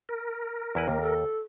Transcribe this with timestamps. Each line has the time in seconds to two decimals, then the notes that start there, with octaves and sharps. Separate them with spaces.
0.09 A#4
0.75 E2 E4 B4
0.88 D#2 A#3
1.01 A4